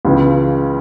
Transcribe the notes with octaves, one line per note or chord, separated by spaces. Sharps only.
C#2 C#3 E3 B3